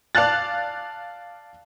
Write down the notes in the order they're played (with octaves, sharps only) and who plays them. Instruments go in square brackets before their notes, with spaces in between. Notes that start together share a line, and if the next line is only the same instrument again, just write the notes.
[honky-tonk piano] D5 F5 A5 F#6 A6